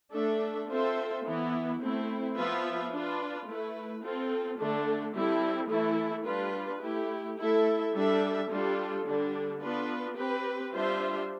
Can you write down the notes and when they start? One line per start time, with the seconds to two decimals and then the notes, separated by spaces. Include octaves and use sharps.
0.12 A3 D4 A4 E5
0.68 C4 F4 A4 C5 E5
1.25 E3 B3 E4
1.80 A3 C4 E4
2.36 F3 B3 F4 B4 E5
2.92 D4 F4 B4
3.46 A3 E4 B4
4.03 C4 F4 A4
4.59 D3 A3 D4 A4
5.14 G3 C4 E4 A4
5.70 E3 A3 E4 A4
6.26 G3 D4 F4 B4
6.82 A3 E4 G4
7.38 A3 E4 A4 E5
7.94 G3 D4 A4 E5
8.50 G3 D4 F4 A4
9.05 D3 G3 D4
9.61 B3 D4 F4 B4
10.16 C4 G4 B4
10.73 G3 D4 F4 C5 E5